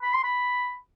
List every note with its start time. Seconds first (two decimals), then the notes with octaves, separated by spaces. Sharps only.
0.02 B5
0.14 C6
0.24 B5